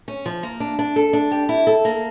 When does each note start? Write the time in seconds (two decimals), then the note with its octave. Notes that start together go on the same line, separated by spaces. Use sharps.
0.08 C#4
0.26 F3
0.43 A#3
0.60 D4
0.79 D4
0.96 A4
1.13 D4
1.31 G4
1.49 E4
1.67 A4
1.85 A#3